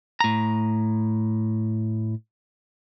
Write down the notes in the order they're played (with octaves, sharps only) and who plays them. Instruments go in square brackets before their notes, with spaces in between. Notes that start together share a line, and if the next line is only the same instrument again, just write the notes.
[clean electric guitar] A2 A#5